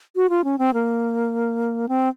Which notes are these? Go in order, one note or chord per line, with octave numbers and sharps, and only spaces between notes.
F#4
F4
C#4
C4
A#3
C4